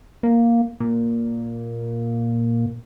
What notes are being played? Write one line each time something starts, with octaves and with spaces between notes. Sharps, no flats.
A#3
A#2